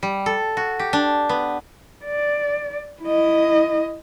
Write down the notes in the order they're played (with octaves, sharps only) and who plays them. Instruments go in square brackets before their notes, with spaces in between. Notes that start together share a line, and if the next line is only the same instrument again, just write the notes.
[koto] G3
A4
F#4
G4
D4
B3
[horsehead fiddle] D5
E4 D#5